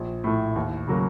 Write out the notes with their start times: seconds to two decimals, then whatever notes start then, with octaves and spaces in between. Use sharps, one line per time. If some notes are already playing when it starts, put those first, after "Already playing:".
Already playing: A#1
0.24 A2 A3
0.56 D#2
0.87 C#3 F#3 A#3